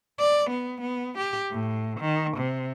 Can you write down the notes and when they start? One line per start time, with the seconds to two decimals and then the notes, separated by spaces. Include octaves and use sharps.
0.20 D5
0.50 B3
0.81 B3
1.18 G4
1.51 A2
2.00 D#3
2.37 C3